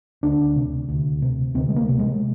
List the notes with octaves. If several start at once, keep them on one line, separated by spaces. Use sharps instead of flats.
D2 D4
C3
D2
C3
D2 C4
G#3
A#3
C3
G#3